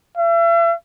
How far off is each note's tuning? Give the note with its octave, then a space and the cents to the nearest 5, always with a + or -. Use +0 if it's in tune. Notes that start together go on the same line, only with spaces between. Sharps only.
E5 +40